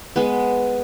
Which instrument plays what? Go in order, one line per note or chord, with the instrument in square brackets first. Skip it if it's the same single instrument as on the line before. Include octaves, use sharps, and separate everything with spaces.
[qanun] G#3 B3